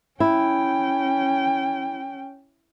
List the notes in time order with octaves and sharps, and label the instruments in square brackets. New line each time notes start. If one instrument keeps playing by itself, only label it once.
[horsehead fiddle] C#4 G5 [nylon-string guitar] E4